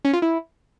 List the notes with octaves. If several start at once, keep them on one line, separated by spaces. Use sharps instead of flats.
C#4
F4
E4